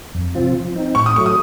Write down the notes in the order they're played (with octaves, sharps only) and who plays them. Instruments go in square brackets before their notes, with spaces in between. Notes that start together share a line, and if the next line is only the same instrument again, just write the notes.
[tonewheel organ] F2
C3 F3 C4 F4
F3
C4 D#4
[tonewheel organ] A2 [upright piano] C#6
[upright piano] D#6
[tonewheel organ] F#3 A3 [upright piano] C#6
[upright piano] D#6